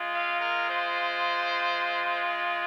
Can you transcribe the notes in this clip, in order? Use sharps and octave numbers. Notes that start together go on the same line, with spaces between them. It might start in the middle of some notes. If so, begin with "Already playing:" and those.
Already playing: G#3 F4
F5
A#4
C5